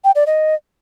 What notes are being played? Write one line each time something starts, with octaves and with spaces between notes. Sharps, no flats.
G5
D5
D#5